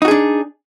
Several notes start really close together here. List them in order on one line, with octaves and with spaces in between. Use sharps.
D#4 F#4 G#4 D4